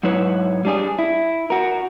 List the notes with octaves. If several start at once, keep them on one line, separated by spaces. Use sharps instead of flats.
G#2 F#3 E4 B4 C#5
G3 D4 G#4
E4
F#4 A#4